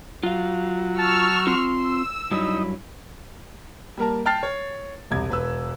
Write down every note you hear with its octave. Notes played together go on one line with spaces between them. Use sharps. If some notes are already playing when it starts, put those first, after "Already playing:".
F#3 F4 F5
A5 C#6 E6 F6
C4 F4 C6
E6
G2 F#3 D#4 E4
G3 A#3 A#4 A5
G5 A5 F6 A6 C7
C#5
E1 C2 G#6
E1 B4 E6